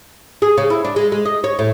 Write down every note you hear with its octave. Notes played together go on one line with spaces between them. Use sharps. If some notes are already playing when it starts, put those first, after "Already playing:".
G#4
C#3
E4
D4
G#3
G#3
D#5
C#5
A2